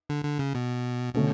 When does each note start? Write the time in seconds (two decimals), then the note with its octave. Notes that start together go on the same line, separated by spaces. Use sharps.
0.09 D3
0.25 D3
0.39 C#3
0.55 B2
1.15 B2 D3 A3 C#4